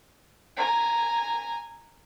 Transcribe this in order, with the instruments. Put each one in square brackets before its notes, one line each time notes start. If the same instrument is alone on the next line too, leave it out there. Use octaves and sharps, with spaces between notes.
[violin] G#5 A#5